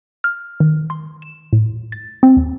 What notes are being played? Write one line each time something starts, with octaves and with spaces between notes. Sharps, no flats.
F6
D#3
C6
E7
A2
A6
C4
D#2